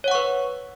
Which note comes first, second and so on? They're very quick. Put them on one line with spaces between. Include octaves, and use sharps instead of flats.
C#5 F#5 C#6 B4